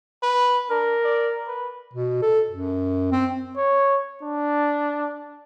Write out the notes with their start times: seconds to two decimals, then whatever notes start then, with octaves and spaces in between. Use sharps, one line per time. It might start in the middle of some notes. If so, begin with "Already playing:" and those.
0.23 B4
0.70 D4 A#4
1.04 D5
1.48 B4
1.93 B2
2.22 A4
2.51 F#2
3.12 C4
3.57 C#5
4.23 D4